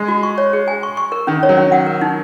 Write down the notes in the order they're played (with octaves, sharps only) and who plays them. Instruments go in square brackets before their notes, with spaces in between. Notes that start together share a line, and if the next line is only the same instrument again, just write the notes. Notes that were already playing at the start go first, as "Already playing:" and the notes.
Already playing: [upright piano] G#3
[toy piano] F#4
C#6
C#5
G#4
G#5
C#6
C#6
A#4
[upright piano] D#3 [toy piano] C#4
[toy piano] C#5
[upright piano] F#3
[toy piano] C#4
F#5
A#4
D#4